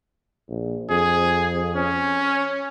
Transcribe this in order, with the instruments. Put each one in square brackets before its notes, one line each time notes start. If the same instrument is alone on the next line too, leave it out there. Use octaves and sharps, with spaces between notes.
[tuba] A#1
[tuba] F2 [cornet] G#4
[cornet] C#4